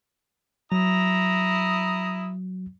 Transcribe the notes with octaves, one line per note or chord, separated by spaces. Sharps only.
F#3 E4 A#5 D#6